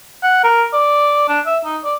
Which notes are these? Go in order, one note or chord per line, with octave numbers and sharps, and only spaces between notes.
F#5
A#4
D5
D4
E5
D#4
D5